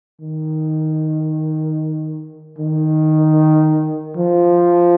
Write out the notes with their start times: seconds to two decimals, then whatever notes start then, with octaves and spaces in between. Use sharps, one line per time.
0.21 D#3
2.58 D#3
4.17 F3